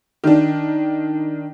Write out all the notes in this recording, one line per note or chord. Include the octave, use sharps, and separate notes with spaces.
D#3 D4